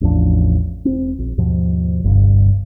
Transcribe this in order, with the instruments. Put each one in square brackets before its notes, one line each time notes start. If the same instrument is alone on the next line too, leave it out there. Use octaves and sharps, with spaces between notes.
[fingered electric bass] A1 E2 F3 D4
E1 C4
A#1
D#2 G#2 B2 F3
G1 C2 G2